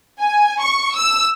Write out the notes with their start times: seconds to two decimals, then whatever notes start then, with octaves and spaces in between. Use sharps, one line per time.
0.19 G#5
0.60 C#6
0.95 E6